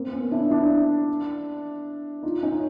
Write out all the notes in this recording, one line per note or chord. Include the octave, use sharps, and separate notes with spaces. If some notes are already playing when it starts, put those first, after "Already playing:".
Already playing: A#3 C4
B3 C#4
D4 E4
D4 E4
D#4 F4
C#4 D#4